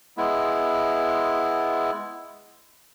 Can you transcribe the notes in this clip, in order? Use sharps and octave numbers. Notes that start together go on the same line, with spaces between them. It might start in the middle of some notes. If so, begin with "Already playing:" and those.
G#3 B3 E4